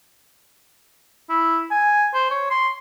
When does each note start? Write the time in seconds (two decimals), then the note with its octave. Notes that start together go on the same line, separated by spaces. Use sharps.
1.30 E4
1.71 G#5
2.14 C5
2.31 C#5
2.50 C6